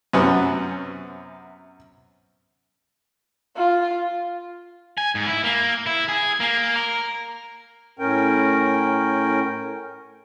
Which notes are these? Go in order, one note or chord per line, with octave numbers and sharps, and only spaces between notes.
F#2 C3 B3 C#4
F4
G#5
G#2
E4
A#3
E4
G#4
A#3
A#4
A2 C#4 A#4 G5